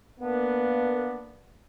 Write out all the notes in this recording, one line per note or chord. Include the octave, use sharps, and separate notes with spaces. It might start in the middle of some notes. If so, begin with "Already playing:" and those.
A#3 B3 D4